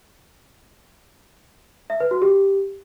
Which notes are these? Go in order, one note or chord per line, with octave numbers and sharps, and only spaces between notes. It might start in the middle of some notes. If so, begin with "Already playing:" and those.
E5
B4
F#4
G4